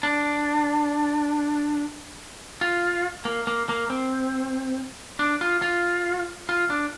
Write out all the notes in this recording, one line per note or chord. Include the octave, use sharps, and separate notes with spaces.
D4
F4
A#3
A#3
A#3
C4
D4
F4
F4
F4
D4